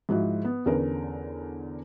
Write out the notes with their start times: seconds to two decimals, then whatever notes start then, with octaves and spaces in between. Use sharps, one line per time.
0.09 G#2 F3 E4 F#4
0.45 B3
0.66 E2 D3 C#4 A#4 B4